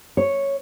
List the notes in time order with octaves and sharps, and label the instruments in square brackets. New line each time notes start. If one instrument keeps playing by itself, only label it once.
[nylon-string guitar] C#5